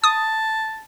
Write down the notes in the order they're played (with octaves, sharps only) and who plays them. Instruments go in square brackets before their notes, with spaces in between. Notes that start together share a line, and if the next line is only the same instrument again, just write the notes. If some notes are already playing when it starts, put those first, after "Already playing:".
[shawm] A5 [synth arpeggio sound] D#6